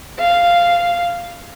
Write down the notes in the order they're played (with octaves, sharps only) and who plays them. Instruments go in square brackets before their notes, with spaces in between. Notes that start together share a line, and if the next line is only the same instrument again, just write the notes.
[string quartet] F5